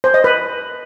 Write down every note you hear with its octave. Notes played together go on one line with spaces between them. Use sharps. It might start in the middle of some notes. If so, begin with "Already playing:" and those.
C5
D#5
B4